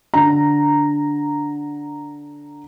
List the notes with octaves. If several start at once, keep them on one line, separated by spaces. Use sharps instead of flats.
D3 A#5